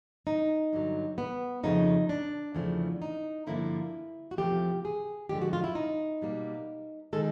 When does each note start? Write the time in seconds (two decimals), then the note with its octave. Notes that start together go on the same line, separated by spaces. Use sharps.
0.27 D#4
0.73 G2 D3 F#3
1.18 B3
1.63 F2 C#3 F3 A3 D#4
2.09 D4
2.55 E2 C#3 F3 A3
3.02 D#4
3.47 G2 D3 F3 A#3 E4
4.31 F#4
4.38 E2 C3 F3 A3 G4
4.85 G#4
5.29 F#2 D3 F3 G#3 G4
5.42 F#4
5.53 F4
5.64 E4
5.75 D#4
6.22 B2 G3 A#3
7.13 D#3 G#3 A4